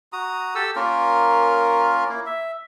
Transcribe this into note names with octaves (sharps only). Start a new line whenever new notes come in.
F#4 A#5 D#6
G4 A4 E6
A#3 C#4 F4 A#4
A#3 E4
E5